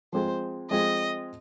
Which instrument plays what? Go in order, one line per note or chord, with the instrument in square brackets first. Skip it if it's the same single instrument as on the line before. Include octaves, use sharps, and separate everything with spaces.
[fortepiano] F3 G#3 C4 G#4 [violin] C5
[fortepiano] F3 G#3 C4 G#4 [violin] D#5